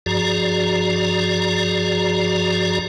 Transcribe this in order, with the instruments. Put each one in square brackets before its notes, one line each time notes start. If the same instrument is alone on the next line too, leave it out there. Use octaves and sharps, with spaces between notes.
[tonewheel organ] G2 F3 F#4 G#4 D5 A#5